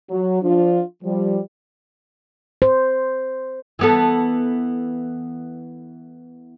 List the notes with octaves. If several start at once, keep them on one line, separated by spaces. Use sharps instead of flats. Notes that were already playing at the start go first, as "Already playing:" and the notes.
F#3
F3 D4 F4
F3 G3
C5
E3 B3 A4